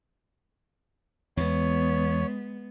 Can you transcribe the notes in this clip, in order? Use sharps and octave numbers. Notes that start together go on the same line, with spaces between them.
E2 E3 G#3 B3 C#5